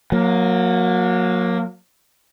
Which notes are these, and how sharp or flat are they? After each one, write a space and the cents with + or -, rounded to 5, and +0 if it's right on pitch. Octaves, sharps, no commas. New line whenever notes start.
F#3 -30 A#3 +0